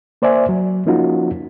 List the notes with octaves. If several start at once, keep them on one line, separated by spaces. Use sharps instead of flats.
A#3 C5 D5 E5 G#5
F#3
F3 A#3 C#4 D#4 F4 F#4